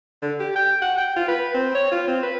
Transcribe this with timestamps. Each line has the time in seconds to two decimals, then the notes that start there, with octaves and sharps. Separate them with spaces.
0.22 D3
0.39 G4
0.56 G5
0.82 F#5
0.98 G5
1.16 F4
1.28 B4
1.54 C4
1.75 C#5
1.92 F4
2.08 C4
2.23 B4